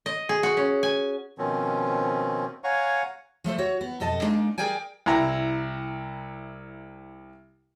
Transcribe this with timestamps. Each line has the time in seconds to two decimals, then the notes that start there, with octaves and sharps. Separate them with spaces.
0.06 D#5
0.29 G#4
0.43 F#4
0.57 C#4
0.83 G#5
1.38 B2 D#3 F3 C4 C#4
2.64 C#5 F5 F#5 G#5 A#5 C#6
3.44 F3 A3 A4 C5
3.58 F#4 C#5
3.81 B3
4.00 F2 B2 A4 D#5 A5
4.22 G#3 A#3 D4 D#4
4.58 G#4 A#4 D5 G5 G#5
5.06 C2 E4 A#5